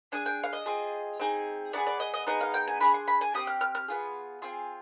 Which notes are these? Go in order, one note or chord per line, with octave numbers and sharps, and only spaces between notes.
D4 G#4 G#5
G5
F5
D#5
C4 F4 G#4
C4 D#4 G#4
B3 D#4 G#4 D5
D5
D#5
D#5
B3 D#4 G#4 D#5
F5
G5
G#5
D4 G#4 B5
C6
B5
G#5
C4 G4 D#6
F6
F6
F6
B3 F4 G#4
C4 F4 G#4